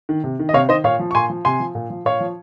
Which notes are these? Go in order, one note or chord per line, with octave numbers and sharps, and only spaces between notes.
D#3
C3
D#3
D#5
C3 C#5 F5
D#3 C5 D#5
A#2 C#5 F5
F3
C#6
A#2 G#5 C6
F3
C3 G#5 C6
F3
A#2
F3
A#2 C#5 F5
F3